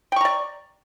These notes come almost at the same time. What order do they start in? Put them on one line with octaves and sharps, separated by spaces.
G5 C#6 A#5 D5